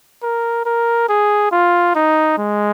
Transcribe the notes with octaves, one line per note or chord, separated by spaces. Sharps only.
A#4
A#4
G#4
F4
D#4
G#3